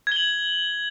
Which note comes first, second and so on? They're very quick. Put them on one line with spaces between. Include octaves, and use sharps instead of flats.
G#6 G7 F#7